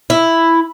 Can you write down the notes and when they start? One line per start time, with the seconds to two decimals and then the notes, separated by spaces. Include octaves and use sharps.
0.10 E4